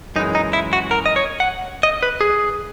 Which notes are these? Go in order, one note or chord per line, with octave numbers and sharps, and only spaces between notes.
F#2 E3 G#3 D#4
D#4
E4
F#4
A#4
D#5
C#5
F#5
D#5
B4
G#4